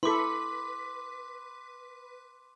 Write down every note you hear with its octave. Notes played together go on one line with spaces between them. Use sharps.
E4 A4 B4 C6 D6 B6